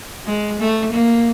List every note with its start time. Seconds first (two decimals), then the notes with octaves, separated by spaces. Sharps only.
0.26 G#3
0.60 A3
0.93 A#3